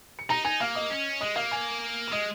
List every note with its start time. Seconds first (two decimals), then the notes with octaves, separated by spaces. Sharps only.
0.19 C#7
0.29 D#4 A#5 A#6
0.44 D#4 G#5 G#6
0.60 A#3 F5 F6
0.75 D#5 D#6
0.91 C#4
1.21 G#3 D#5 D#6
1.36 A#3 F5 F6
1.51 G#5 G#6
2.08 F6
2.12 G#3 D#5 D#6